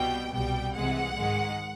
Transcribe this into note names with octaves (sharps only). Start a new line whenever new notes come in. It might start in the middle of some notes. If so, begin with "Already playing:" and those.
Already playing: C2 B2 G3 G5
C2 B2 G3 G5
C2 C3 E3 G#3 F#5
G#2 D#3 G#3